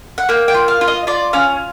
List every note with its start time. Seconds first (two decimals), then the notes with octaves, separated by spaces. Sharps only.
0.18 F#5
0.29 A#3 G5
0.48 G5
0.54 F4
0.68 F5
0.81 F4
0.88 D#5
1.07 F4 D5
1.33 C#4 F5